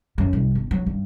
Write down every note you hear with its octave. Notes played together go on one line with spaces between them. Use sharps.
F#2
C2
G1
F#3
G2